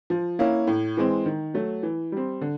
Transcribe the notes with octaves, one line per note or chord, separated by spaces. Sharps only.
F3
A#3 C#4 E4
A2
E3 G#3 C4
D#3
F#3 A3
E3
G3 C4
D3